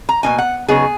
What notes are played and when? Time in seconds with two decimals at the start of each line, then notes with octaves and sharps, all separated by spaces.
0.09 A#5
0.23 B2 A#3 D#4 G#5
0.38 F#5
0.68 C#3 F#3 B3 D#4 G#4